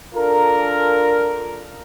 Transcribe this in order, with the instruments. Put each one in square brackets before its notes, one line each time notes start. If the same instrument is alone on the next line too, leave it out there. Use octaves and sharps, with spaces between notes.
[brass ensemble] D4 F4 A4 A#4